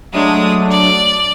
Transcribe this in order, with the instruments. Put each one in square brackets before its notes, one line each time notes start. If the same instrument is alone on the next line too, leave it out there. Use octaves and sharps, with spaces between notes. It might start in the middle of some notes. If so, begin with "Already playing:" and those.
[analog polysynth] F#3 A3 D4 [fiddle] G#3 D#6
[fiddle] D5